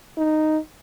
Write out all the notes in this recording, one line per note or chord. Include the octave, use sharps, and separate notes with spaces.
D#4